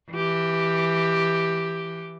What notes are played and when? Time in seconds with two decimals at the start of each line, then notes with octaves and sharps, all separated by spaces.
0.12 E3 G4